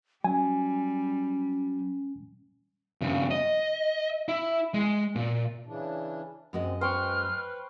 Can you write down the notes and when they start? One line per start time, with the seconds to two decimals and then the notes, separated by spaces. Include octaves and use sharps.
0.24 F#3 G3 C#4 G#5
3.01 G2 C#3
3.31 D#5
4.28 E4
4.74 G#3
5.15 A#2
5.66 C#3 E3 D4
6.53 F#2 C3 G#3 D#5
6.81 B4 C5 G5 C#6 F6